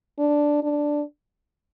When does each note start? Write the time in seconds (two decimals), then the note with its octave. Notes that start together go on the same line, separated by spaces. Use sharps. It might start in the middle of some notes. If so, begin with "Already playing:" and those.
0.19 D4
0.63 D4